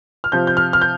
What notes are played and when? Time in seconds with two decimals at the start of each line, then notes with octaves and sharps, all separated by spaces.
0.24 F6
0.32 C3 F3 G6
0.47 G6
0.57 F6
0.73 F6
0.82 G6